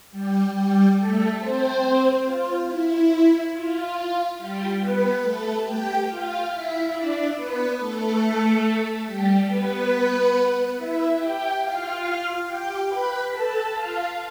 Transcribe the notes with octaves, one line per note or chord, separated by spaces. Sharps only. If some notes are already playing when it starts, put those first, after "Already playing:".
G3 G4
G3 G4
A3 A4
C4 C5
F4
E4
F4
G3 G4
B3 B4
A3 A4
G4 G5
F4 F5
E4 E5
D4 D5
B3 B4
A3 A4
G3 G4
B3 B4
E4 E5
G4 G5
F4 F5
G4 G5
B4 B5
A4 A5
F4 F5